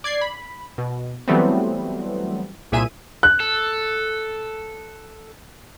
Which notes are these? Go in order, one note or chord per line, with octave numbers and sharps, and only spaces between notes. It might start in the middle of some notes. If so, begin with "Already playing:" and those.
D5 G#6 C7
B5
B2
E3 F#3 G3 A3 B3 C4
C2 A#2 G#4 E5 G#5 D#7
F#6
A4